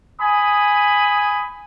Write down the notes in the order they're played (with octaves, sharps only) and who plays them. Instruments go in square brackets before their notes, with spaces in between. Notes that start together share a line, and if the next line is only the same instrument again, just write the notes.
[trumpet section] G#5 B5 D#6